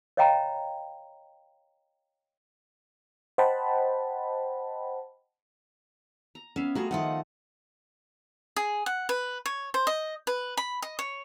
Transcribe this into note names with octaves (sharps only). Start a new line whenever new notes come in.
C#5 D#5 F5 G5 A#5 B5
C5 D#5 F#5 G5 A5 B5
A#5
B3 C#4 E5 F5
G3 A3 F4 F#4 G#4 A#5
D#3 F3 A3 F4 D#5 F#5
G#4
F#5
B4
C#5
C5
D#5
B4
B5
D#5
C#5